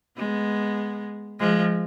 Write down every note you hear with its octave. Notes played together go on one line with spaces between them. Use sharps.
G#3 B3
F3 G#3